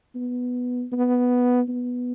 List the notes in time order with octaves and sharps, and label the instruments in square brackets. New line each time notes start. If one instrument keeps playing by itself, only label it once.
[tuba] B3
B3
B3